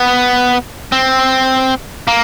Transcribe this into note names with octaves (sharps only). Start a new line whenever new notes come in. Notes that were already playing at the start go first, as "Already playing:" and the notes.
Already playing: B3
C4
A#3